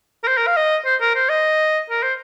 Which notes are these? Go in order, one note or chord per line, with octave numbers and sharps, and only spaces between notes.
A#4
C5
A#4
F5
D#5
C5
A#4
C5
D#5
A#4
C5